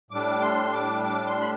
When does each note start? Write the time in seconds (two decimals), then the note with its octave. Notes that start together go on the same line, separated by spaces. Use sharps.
0.11 A2 G3 D4 D6
0.41 C6
0.73 D6
1.04 D6
1.27 C6
1.40 B5